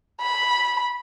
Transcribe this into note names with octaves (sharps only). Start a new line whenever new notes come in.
B5